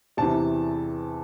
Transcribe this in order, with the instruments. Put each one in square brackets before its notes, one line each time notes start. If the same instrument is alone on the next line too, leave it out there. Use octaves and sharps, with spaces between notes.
[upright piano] E2 C3 E3 A5